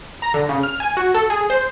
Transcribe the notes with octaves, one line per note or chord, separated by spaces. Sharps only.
A#5
D3
C#3
F6
G#5
F#4
A4
G#4
C5